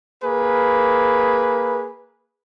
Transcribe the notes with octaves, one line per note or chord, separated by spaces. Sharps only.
A#3 G#4 B4